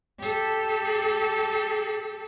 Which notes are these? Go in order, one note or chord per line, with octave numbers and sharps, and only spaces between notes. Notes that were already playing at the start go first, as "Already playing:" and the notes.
G4 A4